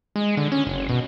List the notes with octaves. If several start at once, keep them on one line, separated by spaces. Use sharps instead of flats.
G#3
D3
C#4
F#1
B2